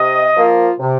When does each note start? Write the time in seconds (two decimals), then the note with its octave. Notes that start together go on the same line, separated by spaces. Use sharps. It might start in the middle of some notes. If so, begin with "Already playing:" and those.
Already playing: C3 D#5
0.36 F3 A#3 F4
0.79 C3